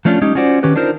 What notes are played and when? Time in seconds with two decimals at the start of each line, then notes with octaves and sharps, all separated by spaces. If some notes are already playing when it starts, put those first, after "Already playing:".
0.05 F3 A3 C#4 D4 E4 F4
0.22 G#3 C#4 D#4 G4
0.35 C#4 F4 F#4 C5 D5
0.63 D#3 C#4 G4 B4
0.76 D4 D#4 F4 A#4 C5